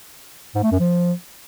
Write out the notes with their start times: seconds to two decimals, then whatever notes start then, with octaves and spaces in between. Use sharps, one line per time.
0.55 G#2
0.63 A3
0.71 F#2
0.80 F3